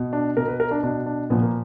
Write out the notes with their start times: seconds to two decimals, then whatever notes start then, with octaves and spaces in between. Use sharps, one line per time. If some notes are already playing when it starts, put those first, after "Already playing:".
Already playing: B2
0.13 D4
0.37 B2 A#4
0.48 B4
0.60 A#4
0.71 D4
0.83 B2 D4
1.06 D4
1.30 A#2 F3 B3
1.42 A#3